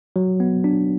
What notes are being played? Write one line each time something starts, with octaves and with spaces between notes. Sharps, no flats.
F#3
B3
D4